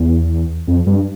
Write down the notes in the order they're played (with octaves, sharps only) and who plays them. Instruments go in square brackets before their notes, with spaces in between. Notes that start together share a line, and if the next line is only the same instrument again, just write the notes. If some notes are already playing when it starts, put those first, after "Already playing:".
Already playing: [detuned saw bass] E2
F2
G2